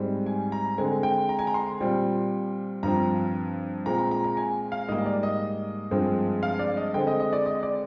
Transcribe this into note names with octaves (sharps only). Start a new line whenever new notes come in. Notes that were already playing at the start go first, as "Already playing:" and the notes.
Already playing: G#2 G3 C4
G#5
A#5
D3 G#3 C4 G#5
G5
A#5
G#5
A#5
C6
A#2 G3 C4
G2 F3 C4 A#5
A#2 G#3 C4 A#5
A#5
A#5
A#5
G#5
F5
G#2 G3 A#3 D#5
D5
D#5
G2 F3 G#3 C4
F5
D5
D#5
D3 G#3 C4 G5
D#5
D#5
D5
D#5
D5